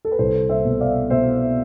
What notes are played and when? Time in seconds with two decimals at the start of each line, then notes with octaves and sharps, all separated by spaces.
0.05 A4
0.12 B4
0.19 C2 A4 C5
0.49 C5 E5
0.65 B2
0.80 D5 F5
1.10 B2 C5 E5